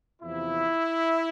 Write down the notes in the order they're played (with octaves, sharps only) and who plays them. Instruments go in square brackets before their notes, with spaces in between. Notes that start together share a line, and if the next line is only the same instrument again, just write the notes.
[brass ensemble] E2 C3 F3 E4